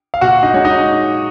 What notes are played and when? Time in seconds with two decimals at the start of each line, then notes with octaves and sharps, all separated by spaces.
0.14 F5
0.21 A#2 F#4 F#5
0.43 D#4 D#5
0.54 G#3 D#4 C#5
0.65 D#4 D#5